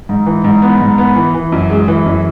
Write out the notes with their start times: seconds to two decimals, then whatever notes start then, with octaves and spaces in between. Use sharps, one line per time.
0.09 G#2
0.26 E3
0.44 G#2
0.62 B3
0.81 G#2
0.98 B3
1.16 E3
1.34 E3
1.52 F#2
1.70 G#3
1.88 E3
2.06 F#2